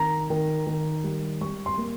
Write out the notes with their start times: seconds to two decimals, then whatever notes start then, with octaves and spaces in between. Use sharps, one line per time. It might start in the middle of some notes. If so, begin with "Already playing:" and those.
Already playing: D#3 A#5
0.30 D#3
0.67 D#3
1.04 G3
1.41 G3 C#6
1.66 C6
1.78 A#3